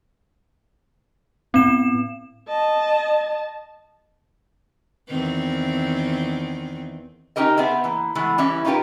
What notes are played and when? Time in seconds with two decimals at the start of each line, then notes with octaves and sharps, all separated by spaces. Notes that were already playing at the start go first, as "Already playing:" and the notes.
1.54 A2 B3 C4 E7
2.48 D#5 A5
5.08 E2 D#3 C4
7.36 C#4 D#4 G4 A#4 D#5
7.57 B3 C4 G#4 E5
7.84 E3 A#3
8.15 E3 G#3 A3 B3
8.38 E3 G3 C#4 E4
8.65 C#4 D#4 F4 G4 A#4 B4